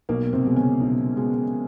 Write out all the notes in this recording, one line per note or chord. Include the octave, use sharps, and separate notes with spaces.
B1 A#3
C3 C4
B2 G#3
C#3 C#4
B1
B2 G#3